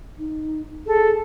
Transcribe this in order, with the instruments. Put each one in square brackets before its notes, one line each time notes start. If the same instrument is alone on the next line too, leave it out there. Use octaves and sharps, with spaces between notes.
[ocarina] D#4
[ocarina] G#4 [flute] A4